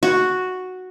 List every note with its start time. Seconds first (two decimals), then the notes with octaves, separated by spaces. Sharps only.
0.03 F#4